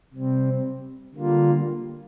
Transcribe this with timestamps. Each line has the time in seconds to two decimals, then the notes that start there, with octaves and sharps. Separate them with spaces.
0.14 C3 G3 C4
1.15 D3 G3 A#3 F4